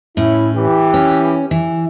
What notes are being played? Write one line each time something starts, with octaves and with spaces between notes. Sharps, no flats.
A2 C#4 E4
E3 G4
C#4
E3